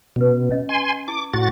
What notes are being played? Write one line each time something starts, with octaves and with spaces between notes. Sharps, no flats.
B2 C#4 B4
C#4 D#5
G#5 C6
E4 D6
A2 F#4 A6